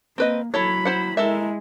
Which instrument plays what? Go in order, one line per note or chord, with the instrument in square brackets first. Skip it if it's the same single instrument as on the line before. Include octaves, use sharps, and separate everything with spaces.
[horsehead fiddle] A#3 [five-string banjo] C4 B4 D#5
[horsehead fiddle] F#3 B5 [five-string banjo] E4 A4 C#5
[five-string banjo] E4 C5 F#5
[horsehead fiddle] G#3 E4 [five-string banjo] A4 A#4 E5